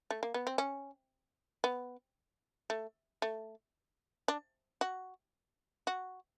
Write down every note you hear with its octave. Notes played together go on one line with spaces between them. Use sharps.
A3
A#3
B3
C4
C#4
B3
A3
A3
D4
F#4
F#4